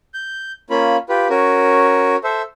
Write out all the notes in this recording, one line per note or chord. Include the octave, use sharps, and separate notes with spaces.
G6
A#3 C#4 F4 B5
F4 G4 B4
C#4 F#4 A#4
A4 C5 E5